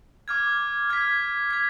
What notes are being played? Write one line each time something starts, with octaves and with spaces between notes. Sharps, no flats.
D6 F6 G#6
F6 G#6 B6
G#6 B6